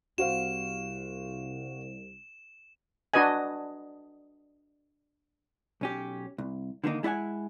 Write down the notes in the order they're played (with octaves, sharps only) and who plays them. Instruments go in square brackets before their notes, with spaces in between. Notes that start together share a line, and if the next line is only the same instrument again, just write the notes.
[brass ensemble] C2 [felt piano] F#4 C5 F5 [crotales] E7
[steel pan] D4 F#4 B4 D#5 G#5
[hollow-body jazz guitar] B1 C#4 G4
C2
D3 D#3 A3 A#3 D#4
G#3 E4 D5 F#5 G#5